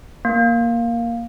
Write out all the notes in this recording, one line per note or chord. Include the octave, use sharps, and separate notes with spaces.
A#3